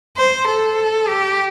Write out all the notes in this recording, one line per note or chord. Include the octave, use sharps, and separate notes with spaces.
C5
A4
G4